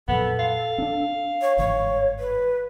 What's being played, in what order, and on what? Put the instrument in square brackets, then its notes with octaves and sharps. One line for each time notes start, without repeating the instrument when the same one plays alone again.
[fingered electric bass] F2 A#2 F#3 [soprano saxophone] B3 [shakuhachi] A4
[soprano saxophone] F5
[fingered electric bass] C#4 D4
[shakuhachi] C#5
[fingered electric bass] G1 G#2 E3 [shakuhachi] C#5
[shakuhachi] B4